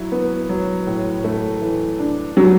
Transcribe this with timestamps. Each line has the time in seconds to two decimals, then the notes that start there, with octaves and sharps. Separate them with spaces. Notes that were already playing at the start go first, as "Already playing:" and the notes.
Already playing: F#3 E4
0.12 B3
0.49 F#3
0.87 A2
1.24 A3
1.62 E3
1.99 D4
2.37 F#3 G3